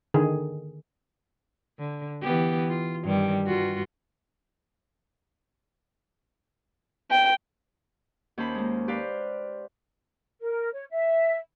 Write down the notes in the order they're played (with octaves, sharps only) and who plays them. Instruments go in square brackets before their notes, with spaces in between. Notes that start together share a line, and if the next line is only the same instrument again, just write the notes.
[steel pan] D3 D#3 G#4
[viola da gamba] D3
E3 B3 G4
F4
G2 D#3 G3
G2 F4 F#4
[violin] G5
[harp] D#2 C#4 C5 A5 B5
G#3 A#3
G4 B4 C5 D5 F5
[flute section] A#4
C#5
E5